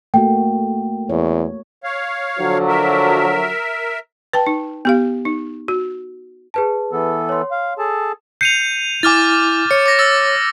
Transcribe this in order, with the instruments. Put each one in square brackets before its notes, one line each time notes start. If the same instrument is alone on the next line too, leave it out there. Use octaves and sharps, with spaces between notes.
[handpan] A3 A#3 F#4 [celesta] G5
[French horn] E2 [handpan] C#5
[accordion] C#5 F5
[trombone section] D3 F3 F#3
[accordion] A#4 E5
[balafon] B4 G5 A5
D#4
B3 G4 F5
D#4
F#4
[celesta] G#4 B4 A5
[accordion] E3 B3 A4
[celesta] C#5 C6
[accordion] F5
G#4 A4 A5
[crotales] G6 D#7 F7 [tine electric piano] C7 C#7
[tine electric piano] E4 G#5 [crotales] D6 F6 A6
[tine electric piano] C#5 [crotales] C#7
[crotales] D6 A#6
E6 A6